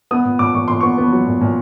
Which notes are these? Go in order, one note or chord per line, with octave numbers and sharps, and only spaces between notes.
B3 D#6
A#2
A#2 D6
A#2 C#6
A#2 C6
B3 C#6
B3
F#3
A#2
A#2